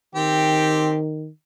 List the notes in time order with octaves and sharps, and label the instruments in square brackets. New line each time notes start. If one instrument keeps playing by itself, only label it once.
[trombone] D#3 [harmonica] C4 G4